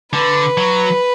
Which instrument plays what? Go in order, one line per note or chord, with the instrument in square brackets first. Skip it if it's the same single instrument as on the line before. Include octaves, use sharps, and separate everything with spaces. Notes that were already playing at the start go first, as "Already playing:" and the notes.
[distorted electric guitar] D3 [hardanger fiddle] B4
[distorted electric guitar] F#3